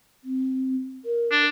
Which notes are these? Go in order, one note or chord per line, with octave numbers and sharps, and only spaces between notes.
C4
A#4
D4